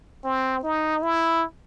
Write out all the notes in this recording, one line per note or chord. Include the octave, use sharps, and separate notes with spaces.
C4
D#4
E4